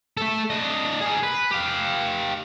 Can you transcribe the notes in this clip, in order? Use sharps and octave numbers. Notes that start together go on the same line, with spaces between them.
A3 A4
D4 D#5
G#4 A#4
B4
G4 F5